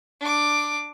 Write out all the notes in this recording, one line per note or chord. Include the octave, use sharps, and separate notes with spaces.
D4 D6